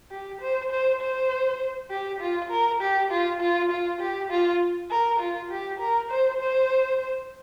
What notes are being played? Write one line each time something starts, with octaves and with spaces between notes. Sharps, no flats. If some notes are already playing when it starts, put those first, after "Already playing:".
G4
C5
C5
C5
G4
F4
A#4
G4
F4
F4
F4
G4
F4
A#4
F4
G4
A#4
C5
C5